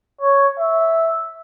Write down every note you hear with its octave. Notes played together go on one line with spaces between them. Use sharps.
C#5
E5